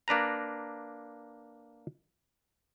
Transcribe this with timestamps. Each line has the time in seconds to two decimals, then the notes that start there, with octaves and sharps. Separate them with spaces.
0.08 A#3 D4 B4 A#5